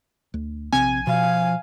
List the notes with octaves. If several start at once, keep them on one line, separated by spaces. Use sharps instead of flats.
D2
A#1 C3 C4 G#5
B2 F3 F5